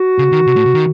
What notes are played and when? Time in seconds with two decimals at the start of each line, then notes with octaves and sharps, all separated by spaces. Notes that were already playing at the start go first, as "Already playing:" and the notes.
Already playing: F#4
0.18 C#3
0.32 D#3
0.47 C3
0.56 A2
0.65 C3
0.74 D#3